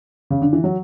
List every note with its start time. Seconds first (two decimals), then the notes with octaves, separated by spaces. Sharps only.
0.30 C#3
0.42 D3
0.53 E3
0.64 F#3